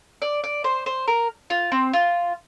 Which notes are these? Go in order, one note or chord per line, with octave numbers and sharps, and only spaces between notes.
D5
D5
C5
C5
A#4
F4
C4
F4